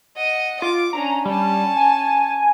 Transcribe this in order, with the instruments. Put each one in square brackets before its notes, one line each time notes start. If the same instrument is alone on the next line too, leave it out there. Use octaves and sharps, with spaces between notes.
[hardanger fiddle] D#5 F#5
[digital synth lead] F4 [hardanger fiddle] D6
[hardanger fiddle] C#4 D4 [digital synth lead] A#5
[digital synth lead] G3 [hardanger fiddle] C#4 A5
[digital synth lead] G#5